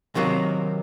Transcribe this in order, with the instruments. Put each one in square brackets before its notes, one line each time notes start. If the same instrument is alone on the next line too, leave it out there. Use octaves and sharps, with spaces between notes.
[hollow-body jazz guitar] C3 D#3 F#3 A#3